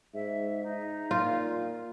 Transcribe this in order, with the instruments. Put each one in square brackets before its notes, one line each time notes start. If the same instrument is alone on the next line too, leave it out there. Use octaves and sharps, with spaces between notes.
[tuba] G#2 [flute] E5
[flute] D#4
[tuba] A#2 [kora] F4